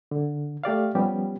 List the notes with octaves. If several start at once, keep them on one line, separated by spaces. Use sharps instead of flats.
D3
A3 G4 D5 F5
F3 G3 B3 C#4 G4